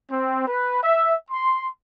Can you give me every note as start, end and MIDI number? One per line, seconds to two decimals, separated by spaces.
0.11 0.46 60
0.47 0.79 71
0.83 1.15 76
1.30 1.69 84